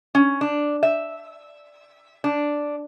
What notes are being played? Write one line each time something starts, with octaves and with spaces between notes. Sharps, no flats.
C#4
D4
E5
D4